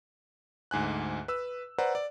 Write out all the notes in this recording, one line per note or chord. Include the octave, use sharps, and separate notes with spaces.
D2 G#2 G#5 F#6
B4 E6
B4 C5 D5 F#5 A#5
D5